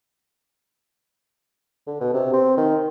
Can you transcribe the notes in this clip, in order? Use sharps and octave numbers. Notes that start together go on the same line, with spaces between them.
D3
B2
C3
C4
D#3